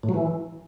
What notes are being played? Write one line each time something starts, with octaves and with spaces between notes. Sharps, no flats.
A2
F#3
E3